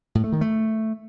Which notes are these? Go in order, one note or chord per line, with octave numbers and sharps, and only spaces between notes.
A2
A3
D#3
A3